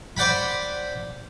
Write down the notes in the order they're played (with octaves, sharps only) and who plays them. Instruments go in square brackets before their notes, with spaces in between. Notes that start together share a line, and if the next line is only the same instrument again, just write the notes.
[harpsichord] C5 D5 F#5 G5 B5